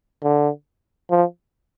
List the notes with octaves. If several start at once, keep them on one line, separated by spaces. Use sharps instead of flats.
D3
F3